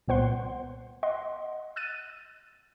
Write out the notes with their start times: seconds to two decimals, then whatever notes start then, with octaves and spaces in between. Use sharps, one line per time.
0.08 C2 A#2 B3 C5 F#5 C6
1.03 D#5 F#5 C6
1.76 E6 F#6 A6 D#7